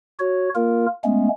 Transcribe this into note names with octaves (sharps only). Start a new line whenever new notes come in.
F#4 C#5
A#3 F4 A#4
G#3 A3 B3 C#4